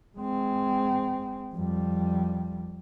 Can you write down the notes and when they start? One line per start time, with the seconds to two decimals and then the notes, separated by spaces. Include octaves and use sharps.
0.17 G#3 C4
1.54 F2 G3